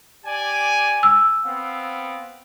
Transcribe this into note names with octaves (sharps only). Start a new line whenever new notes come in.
G4 D5 G#5
E6
B3 C4 F5